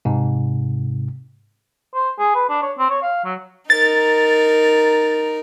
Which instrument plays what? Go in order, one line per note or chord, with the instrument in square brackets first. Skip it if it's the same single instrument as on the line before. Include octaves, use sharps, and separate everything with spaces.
[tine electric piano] G#2 C3
[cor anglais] C5
G#4
B4
D4
C#5
C4
C#5
F5
F#3
[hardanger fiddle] D#4 A#4 [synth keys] A6